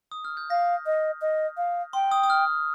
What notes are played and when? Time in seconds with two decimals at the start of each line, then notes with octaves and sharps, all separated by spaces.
0.11 D#6
0.25 F6
0.37 G6
0.50 F5 A#6
0.86 D#5
1.22 D#5
1.57 F5
1.93 G5 C6
2.12 D#6
2.23 D#6
2.30 F6